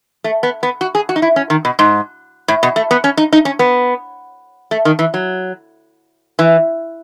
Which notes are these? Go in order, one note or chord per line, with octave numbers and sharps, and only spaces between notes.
A3
B3
B3
F#4
G#4
F#4
D#4
E4
C#4
D#3
B2
G#2
A2
B2
A3
B3
C#4
D#4
D#4
C#4
B3
A3
D#3
E3
F#3
E3